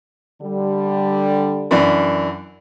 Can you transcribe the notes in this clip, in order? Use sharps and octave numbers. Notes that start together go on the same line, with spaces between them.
D3 G3
F#2 E3 D4